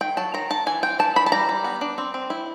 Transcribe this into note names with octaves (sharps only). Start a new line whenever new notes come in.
D#3 G5
F#3 A5
D#3 A#5
D#3 A5
E3 G#5
C4 G5
E3 A5
E3 B5
A5
G3 A#5
G3
B3
D4
C4
C4
E4